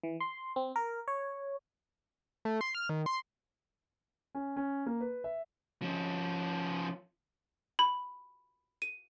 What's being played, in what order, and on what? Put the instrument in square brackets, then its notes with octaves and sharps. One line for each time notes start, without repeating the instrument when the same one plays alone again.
[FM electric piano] E3
C6
C4
A#4
C#5
[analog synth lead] A3
C6
F6
D#3
C6
[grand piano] C#4
C#4
A#3
B4
E5
[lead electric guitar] F3 C#4
[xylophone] B5
D#7